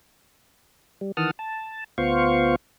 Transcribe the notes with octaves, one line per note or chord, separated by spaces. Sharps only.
G3
D#3 E3 F#5 A5 D#6 F6
A5
D2 B3 F4 C5 F5 C#6